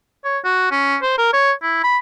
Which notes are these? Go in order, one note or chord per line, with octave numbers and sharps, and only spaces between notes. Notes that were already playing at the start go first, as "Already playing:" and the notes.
C#5
F#4
C#4
C5
A#4
C#5
E4
B5